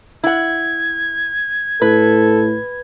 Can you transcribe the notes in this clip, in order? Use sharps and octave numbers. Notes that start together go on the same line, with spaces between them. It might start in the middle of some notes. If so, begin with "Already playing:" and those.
E4 F#5 G#6
A2 A4 B4